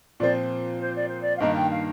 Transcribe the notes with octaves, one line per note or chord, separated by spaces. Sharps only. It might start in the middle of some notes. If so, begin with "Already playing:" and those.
A#2 F3 C4 D5
C5
D5
C5
D5
F5
G2 D#3 A#3 D#5
G5
F5